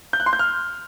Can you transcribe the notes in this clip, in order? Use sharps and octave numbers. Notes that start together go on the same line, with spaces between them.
G6
F#6
C6
G6
F6